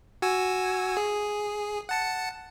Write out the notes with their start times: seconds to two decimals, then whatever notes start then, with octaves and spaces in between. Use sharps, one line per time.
0.22 F#4 G#5 E6
0.97 G#4
1.89 F#5 A5 C#7